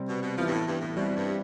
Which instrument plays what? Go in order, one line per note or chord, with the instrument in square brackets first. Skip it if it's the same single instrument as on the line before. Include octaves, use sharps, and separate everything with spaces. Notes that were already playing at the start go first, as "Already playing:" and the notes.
Already playing: [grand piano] C3 G3 C4
[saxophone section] B2
B2
[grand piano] E3 B3 E4 [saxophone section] F3
[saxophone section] G2
A2
G2
A2
[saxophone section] B2 [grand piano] G3 C4 E4
[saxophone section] G2